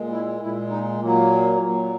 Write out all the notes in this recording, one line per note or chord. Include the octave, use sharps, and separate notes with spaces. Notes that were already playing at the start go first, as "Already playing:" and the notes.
Already playing: A#2 G#3
E4
A#2 G#3 E4
D#4
A#2 F#3 A#3
A#2 F#3